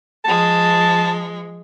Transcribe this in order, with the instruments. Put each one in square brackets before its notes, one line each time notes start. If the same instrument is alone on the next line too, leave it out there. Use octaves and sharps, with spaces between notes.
[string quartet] F3 G#3 [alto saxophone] A5